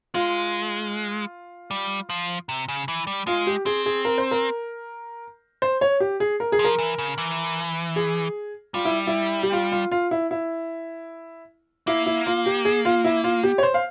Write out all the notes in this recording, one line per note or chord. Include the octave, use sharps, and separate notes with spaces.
G#3 F4
G3
F3
C3
C#3
E3
G3
G#3 F4
G4
C4 G#4
G#4
A#4
C5
A#4
C5
C#5
G4
G#4
A#4
G#4
F3
A#4
E3
C#3
E3
G#4
G3 F4
E4
E4
G4
F4
F4
F4
E4
E4
A#3 E4
E4
F4
G4
G#4
F4
E4
F4
G4
C#5
C5
F5